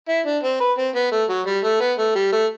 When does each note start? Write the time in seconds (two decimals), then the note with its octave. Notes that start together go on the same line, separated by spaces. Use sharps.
0.09 E4
0.26 D4
0.43 C4
0.61 B4
0.78 C4
0.95 B3
1.12 A3
1.29 F#3
1.47 G3
1.64 A3
1.81 B3
1.98 A3
2.16 G3
2.33 A3